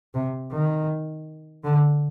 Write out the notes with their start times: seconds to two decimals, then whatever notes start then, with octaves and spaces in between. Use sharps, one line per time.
0.14 C3
0.52 D#3
1.64 D3